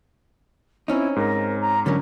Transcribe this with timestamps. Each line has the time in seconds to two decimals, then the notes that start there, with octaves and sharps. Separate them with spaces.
0.88 C4 C#4 D#4 E4
1.16 G#2 A#4
1.61 A#5
1.86 D3 F#3 C#4 A#4